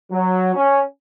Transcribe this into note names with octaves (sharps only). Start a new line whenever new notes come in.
F#3
C#4